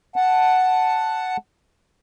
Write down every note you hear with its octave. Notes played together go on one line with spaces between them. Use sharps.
F#5 A5